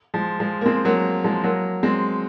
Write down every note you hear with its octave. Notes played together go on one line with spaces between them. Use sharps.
F3 G#3
F3 G#3
A#3
G#3 C4
F#3 A#3
F3 G#3
F#3 A#3
G#3 C4